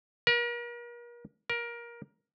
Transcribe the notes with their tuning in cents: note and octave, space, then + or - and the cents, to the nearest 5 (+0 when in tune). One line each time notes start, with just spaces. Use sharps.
A#4 +40
A#4 +20